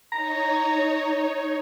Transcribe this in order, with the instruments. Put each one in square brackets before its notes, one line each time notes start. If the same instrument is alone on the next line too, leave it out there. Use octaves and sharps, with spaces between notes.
[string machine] D#4 C#5 [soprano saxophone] A#5